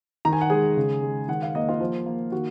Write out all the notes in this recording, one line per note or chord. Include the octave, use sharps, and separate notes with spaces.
D#3 A#5
G#5
F#5
G#3 G#4 G#5
C#3
G#3
D#3 F#5
F5
A#3 D#5
F4 F5
F3
A#3
D#3 F#4